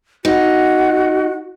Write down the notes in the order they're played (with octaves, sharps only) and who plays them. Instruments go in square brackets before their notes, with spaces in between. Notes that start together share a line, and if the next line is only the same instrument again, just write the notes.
[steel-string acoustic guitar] D#4 [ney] F#4